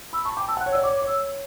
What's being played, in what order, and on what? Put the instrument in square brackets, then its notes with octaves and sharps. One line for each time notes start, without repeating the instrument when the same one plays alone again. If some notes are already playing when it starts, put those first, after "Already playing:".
[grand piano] B5 [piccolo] E6
[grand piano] A5 [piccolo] C#6
[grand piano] G5 [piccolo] D6
[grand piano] A5 [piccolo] E6
[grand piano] F#5 [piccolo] F#6
[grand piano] C#5
[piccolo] E6
[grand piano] D5
[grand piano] C#5 [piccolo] D6
[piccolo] D6
[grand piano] C#5
[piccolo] E6